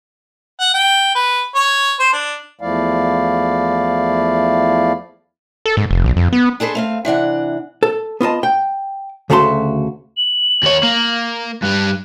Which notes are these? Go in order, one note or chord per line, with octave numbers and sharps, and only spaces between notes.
F#5
G5
B4
C#5
C5
D4
E2 F3 A3 E4 D5 F5
A4
G#2
F1
B1
F2
B3
D4 G#4 A4 B4 C5
A3 C4 F5
C3 E3 D4 F#5
A4
B3 F4 D#5 A5
G5
D2 C#3 A3 F#4 A5 C6
F#7
D#2 C#5
A#3
G2 G3 F#6